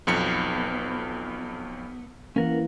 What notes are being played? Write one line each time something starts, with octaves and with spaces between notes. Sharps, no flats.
B1 F2 B3 C#7
E3 A#3 C#4 A#4 F#5